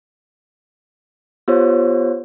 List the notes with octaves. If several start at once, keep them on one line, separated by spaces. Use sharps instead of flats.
B3 F4 G4 C5 C#5